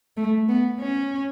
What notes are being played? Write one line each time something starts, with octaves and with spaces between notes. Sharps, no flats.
A3
B3
C#4